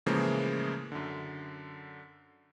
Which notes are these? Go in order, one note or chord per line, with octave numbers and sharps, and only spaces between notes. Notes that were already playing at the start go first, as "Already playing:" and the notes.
A2 C#3 E3 F3 G#3 A#3
F#2 D3